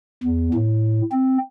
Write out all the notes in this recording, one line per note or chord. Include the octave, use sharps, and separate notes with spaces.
E2
A2
C4